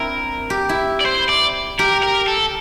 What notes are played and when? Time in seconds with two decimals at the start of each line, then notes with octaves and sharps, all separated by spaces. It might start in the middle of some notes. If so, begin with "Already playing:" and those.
Already playing: C4 D4 E4 A#4
0.50 G4
0.69 E4
1.01 D5
1.06 C5
1.29 D5
1.79 G4 A#4
2.03 A#4
2.27 A4